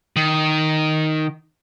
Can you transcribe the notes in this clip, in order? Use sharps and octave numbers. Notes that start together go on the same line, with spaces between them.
D#3